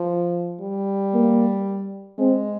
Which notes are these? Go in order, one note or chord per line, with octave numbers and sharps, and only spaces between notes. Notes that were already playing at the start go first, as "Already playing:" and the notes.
Already playing: F3
G3
A#3
G#3 C4